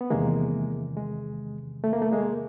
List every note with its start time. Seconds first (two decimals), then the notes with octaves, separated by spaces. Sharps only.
0.01 B3
0.10 E2 C3 D#3 G#3 A#3
0.97 G#3
1.84 A3
1.93 A#3
2.02 A3
2.11 G#3 A#3